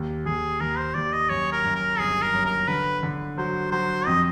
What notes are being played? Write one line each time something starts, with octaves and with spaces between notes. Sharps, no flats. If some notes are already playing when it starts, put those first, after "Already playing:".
Already playing: D#2
D#2 G#4
D#2 A#4
C5
D#2 D5
D#5
F#2 C#5
A#4
F#2
A#4
G1 G#4
A#4
F#2
A#4
D3 B4
D3
F#3 C5
F#3 C5
F2 D#5